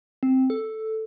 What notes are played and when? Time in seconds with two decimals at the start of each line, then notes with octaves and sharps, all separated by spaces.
0.23 C4
0.50 A4